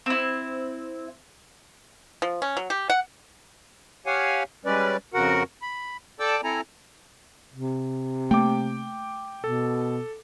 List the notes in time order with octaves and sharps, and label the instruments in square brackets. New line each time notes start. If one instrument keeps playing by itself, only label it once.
[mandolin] C4 E4
[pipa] F3
C#4
F#3
G4
F#5
[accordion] G4 C#5 F5 F#5 G#5
G3 G#3 C#4 B4 D5
F2 C#3 F#4 A#4 F#5
B5
A4 D5 G5 A5 D6 E6
C4 E4 A4 G#5 A#5
[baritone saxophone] C3
[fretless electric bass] A3 A#3 [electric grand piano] G5 D6
[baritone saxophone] B2 [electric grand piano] A4